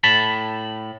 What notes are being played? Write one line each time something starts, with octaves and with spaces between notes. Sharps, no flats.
A2 A5 B5